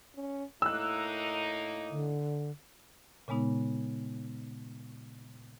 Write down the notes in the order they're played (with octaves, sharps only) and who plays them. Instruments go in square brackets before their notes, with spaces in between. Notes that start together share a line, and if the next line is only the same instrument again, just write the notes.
[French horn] C#4
[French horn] A2 [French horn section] A#3 D#4 [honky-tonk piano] E6 F#6
[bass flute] D3
[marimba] A#2 C#3 G#3 B3 D#4